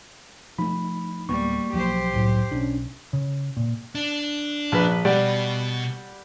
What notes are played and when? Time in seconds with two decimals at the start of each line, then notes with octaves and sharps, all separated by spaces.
0.58 F3 A3 D#4 B5
1.29 D1 G3 A#3 B3 C#6
1.73 B1 F3 F#3 G4 C5
2.13 F#1 C2 A2 F#3
2.52 B1 C#4 D4
3.13 C#3
3.57 A#2
3.95 D4
4.72 A#1 B4
5.05 B2 G3 D5 F#5